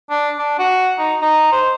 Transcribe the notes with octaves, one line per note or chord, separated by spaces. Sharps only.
D4
D4
F#4
D#4
D#4
C5